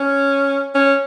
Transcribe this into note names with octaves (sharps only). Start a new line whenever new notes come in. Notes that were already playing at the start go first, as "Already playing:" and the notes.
Already playing: C#4
C#4